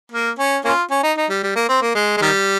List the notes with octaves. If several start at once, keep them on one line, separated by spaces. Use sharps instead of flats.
A#3
C#4
A#3 C#4 F4
C#4
D#4
D#4
G3
G3
A#3
C4
A#3
G#3
G#3
D#3 G3